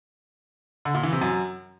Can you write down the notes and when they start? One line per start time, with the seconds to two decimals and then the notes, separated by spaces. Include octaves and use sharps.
0.85 D3
0.94 A#2
1.03 E3
1.12 C3
1.22 F#2